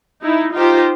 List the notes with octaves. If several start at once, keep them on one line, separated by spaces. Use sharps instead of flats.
D#4 E4
D#4 F4 G4 C5